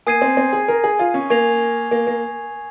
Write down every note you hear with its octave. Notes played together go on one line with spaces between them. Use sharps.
A#3 G#5 D#6 G#6 C7 D#7
C4
C4
G#4
A#4
G#4
F4
C#4
A#3 G#5 C#6 G#6 C7 F7
A#3
A#3